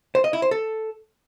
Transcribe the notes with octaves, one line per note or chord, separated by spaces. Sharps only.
C5
D#5
E4
C5
A4